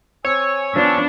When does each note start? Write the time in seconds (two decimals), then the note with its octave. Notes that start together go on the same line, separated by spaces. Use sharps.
0.25 C4 C#5 G#5 E6
0.76 F3 B3 D4